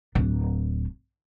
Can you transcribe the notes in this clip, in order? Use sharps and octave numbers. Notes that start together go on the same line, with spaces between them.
D1 D4